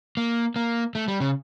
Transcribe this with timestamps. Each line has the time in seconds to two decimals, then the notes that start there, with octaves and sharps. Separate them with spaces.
0.17 A#3
0.56 A#3
0.95 A3
1.08 G3
1.20 C#3